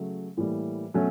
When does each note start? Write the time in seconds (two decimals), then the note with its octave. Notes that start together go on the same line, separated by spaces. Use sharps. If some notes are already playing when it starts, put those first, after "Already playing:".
Already playing: C#3 F#3 A3
0.37 A2 E3 G3 A#3
0.94 B2 F#3 A3 C#4